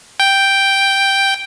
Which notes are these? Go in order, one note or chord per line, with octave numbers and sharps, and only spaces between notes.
G5